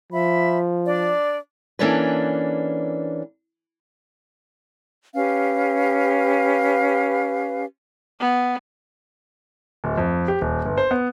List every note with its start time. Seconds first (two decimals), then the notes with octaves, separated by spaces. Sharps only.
0.13 F3 E5 B5
0.86 D4 D5
1.79 E3 A#3 C#4 D4 A4 B4
5.15 C#4 G4 B4 F5
8.20 B3
9.84 D1
9.98 F2
10.28 G4
10.41 D#1
10.66 G1
10.78 C5
10.91 B3